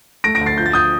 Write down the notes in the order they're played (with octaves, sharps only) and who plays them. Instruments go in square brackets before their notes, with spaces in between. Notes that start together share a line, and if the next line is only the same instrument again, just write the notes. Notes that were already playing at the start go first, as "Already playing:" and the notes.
[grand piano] A3 A#6 D7
A#6 D7
D2
A6 C7
F3 G6
A6
D#6 G6